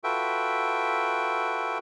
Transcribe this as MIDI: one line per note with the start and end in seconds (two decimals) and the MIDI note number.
0.04 1.78 65
0.04 1.78 66
0.04 1.78 69
0.04 1.78 71
0.04 1.78 76
0.04 1.78 79